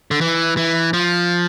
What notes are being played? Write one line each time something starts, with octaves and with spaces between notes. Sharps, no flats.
D3
E3
E3
F3